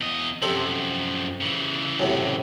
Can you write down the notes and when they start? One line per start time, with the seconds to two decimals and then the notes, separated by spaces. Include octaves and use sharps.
0.01 E2 D#5
0.42 F#2 C3 F3 A4 C5
1.41 C#3 E3
2.00 F#2 A2 C3